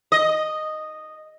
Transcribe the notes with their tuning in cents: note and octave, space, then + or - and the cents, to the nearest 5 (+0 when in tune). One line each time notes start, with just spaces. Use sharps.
D#5 -5